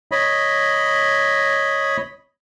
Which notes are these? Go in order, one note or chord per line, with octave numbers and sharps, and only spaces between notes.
C#5 D#5 B5